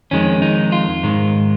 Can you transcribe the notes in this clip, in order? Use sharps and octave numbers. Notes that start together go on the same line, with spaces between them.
F2 D#3 G#3 C#4
D#4
F4
G#2 D#3 G#3